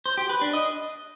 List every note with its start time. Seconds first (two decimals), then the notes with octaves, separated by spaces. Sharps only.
0.06 C5
0.18 G4
0.29 B4
0.41 D4
0.53 D#5